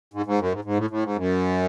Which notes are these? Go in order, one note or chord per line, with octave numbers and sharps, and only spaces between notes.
G#2
G#2
F#2
G#2
G#2
A2
A2
G#2
F#2